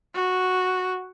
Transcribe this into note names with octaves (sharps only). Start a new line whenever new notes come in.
F#4